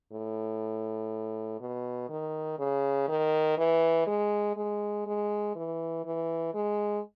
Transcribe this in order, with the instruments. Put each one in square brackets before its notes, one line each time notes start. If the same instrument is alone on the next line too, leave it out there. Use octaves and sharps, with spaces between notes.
[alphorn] A2
B2
D#3
C#3
D#3
E3
G#3
G#3
G#3
E3
E3
G#3